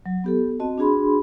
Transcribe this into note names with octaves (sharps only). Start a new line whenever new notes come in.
F#3
B3 G4 A4
C4 F#4 D#5 A5
D4 F#4 G#4 B5 C6